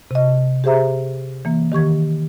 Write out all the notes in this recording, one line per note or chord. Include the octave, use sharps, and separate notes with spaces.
C3 D#5
G4 G#4 C5 E5 A#5
E3 A#3
D#3 G4 C#6 G#6